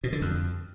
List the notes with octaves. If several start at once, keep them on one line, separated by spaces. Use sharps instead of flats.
B2
D3
F2